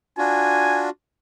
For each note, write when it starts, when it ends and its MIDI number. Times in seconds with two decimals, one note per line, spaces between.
0.18 0.90 62
0.18 0.90 65
0.18 0.90 66
0.18 0.83 80